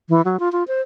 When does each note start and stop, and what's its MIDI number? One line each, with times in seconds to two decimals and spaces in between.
0.09 0.21 52
0.25 0.39 54
0.40 0.51 65
0.52 0.63 65
0.68 0.81 72